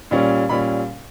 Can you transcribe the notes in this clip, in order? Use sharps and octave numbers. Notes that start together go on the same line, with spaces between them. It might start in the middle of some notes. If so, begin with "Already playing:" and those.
A#2 G3 C#4
A#2 G3 C#4 B5